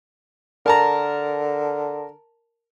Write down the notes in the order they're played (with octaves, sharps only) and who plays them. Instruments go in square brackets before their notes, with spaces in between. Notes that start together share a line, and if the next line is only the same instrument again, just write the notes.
[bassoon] D3 [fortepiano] A#4 A5 A#5